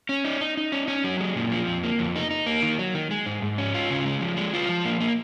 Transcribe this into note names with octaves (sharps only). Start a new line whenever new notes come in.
C#4
D#4
D#4
D#4
C#4
C#4
F#3
G#3
A#2
F3
F2
A#3
F2
D#4
D#4
A#3
D#3
F#3
D#3
G#3
G#2
G#2
C#4
F4
C#3
G#3
F3
G#3
F4
F3
A#3
A#3